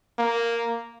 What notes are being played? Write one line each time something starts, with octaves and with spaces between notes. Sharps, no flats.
A#3